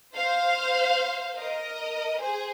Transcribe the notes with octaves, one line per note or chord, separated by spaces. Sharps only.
C5 F5
A#4 D#5
G#4 C5